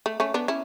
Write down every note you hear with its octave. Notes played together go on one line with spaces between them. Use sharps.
A3
A3 C#4
B3 D4
C#4 E4